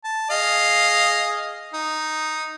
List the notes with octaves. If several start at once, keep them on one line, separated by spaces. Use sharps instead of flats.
A5
G#4 D#5 F5
D#4